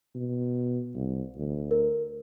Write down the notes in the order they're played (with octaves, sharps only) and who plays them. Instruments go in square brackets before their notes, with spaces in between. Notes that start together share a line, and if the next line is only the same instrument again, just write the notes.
[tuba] B2
C2
D2
[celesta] A#4